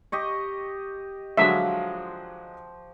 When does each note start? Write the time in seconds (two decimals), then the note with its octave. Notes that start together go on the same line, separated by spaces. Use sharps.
0.12 G4 D#5 C#6
1.37 D3 F3 F#3 G#3 E5